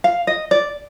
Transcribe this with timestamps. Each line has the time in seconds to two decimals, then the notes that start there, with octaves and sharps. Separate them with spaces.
0.04 F5
0.27 D#5
0.51 D5